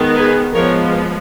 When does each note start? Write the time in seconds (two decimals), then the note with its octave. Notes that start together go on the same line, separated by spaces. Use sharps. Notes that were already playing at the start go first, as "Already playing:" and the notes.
Already playing: D#3 G#3 B3
0.15 G#4 B4
0.54 F3 G#3 B3 A#4 C#5